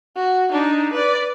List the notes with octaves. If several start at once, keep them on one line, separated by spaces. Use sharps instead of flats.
F#4
D4 D#4
B4 D5